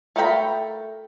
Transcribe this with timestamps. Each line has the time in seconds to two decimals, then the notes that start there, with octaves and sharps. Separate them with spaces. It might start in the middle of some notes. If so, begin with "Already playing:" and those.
0.16 A3 A4 A#4 G5 B5